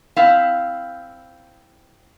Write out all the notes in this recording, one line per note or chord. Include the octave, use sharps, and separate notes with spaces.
C4 E4 F5